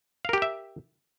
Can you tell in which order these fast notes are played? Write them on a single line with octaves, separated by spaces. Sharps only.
F5 A#4 G4 G5 E5